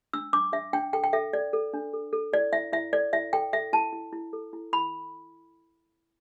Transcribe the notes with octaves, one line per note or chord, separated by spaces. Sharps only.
D4 E6
D4 D6
D4 E5
D4 G5
A4 G5
G5
A4 E5
A4 D5
A4
D4
A4
A4
E4 D5
E4 E5
E4 E5
A4 D5
E4 E5
A4 G5
A4 E5
E4 A5
E4
E4
A4
E4
E4 B5